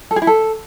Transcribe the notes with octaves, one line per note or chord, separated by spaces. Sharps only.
A4
G#4
E4
A4